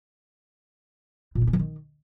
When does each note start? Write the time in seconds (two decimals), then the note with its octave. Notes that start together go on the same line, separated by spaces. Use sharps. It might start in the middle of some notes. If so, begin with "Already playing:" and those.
1.35 A#2
1.41 D#4
1.47 C#4
1.53 E3
1.59 D#3